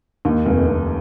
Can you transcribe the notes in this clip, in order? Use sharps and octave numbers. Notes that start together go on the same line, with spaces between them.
D#2
F1
F1